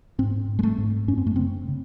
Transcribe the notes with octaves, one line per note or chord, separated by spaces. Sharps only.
G#2 C4
G#2
G#3
A3
G#2
F#2 C#4
C4
A3
C#3 C4
C#3